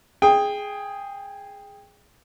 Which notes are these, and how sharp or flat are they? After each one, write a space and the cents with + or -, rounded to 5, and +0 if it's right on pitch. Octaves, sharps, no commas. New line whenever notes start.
G#4 +0 G5 +20